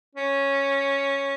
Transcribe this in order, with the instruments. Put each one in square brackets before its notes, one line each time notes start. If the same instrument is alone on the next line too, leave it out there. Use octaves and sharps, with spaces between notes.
[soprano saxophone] C#4